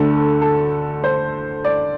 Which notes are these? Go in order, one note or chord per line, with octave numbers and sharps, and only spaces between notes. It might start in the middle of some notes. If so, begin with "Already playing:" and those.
Already playing: D2 D3 A3 A4
A4
C5
D5